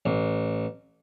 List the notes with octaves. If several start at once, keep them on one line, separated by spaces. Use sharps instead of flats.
A1